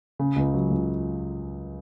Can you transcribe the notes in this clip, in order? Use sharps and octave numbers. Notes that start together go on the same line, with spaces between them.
C#3
C#2
F#3
C#2